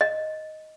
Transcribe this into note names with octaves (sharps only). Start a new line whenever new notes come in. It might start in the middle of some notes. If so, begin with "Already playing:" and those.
D#5